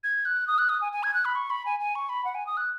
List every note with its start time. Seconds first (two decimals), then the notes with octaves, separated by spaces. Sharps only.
0.04 G#6
0.25 F#6
0.47 D#6
0.58 F#6
0.69 D#6
0.81 G#5
0.92 G#5
1.03 G#6
1.14 F#6
1.25 B5
1.35 C#6
1.50 B5
1.66 G#5
1.80 G#5
1.95 C#6
2.09 B5
2.25 F#5
2.35 G#5
2.47 D#6
2.57 F#6